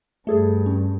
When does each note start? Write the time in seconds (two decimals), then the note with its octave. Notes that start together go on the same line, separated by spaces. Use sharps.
0.27 G2 A3 G#4 A4
0.66 C#4